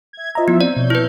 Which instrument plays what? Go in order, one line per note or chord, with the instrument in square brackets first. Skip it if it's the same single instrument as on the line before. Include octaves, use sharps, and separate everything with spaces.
[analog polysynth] E5 G#6
[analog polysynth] F4 C5 E5 [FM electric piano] D#5 A#5
[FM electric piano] F3 E4 [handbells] B3
[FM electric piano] C4 [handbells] D5
[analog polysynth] B2 C#5 G6
[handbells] E4 B4